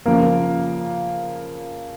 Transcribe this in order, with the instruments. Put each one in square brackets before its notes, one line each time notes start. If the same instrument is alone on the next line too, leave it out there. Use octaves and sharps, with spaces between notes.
[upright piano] C#3 F3 A#3